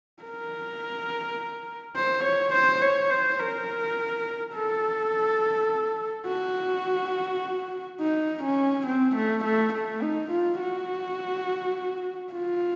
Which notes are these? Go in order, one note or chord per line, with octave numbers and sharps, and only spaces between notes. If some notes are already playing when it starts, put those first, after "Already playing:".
A#4
C5
C#5
C5
C#5
C5
A#4
A4
F#4
D#4
C#4
C4
A3
A3
A3
D#4
F4
F#4
F4